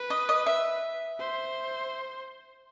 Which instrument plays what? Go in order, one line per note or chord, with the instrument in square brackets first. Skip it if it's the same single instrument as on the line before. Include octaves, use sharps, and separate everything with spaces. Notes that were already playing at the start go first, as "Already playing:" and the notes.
Already playing: [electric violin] B4
[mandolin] D#5
D#5
E5
[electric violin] C5